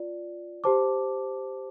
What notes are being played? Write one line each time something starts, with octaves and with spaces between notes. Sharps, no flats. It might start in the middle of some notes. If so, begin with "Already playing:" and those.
Already playing: F4 D5
G4 C5 A5 D6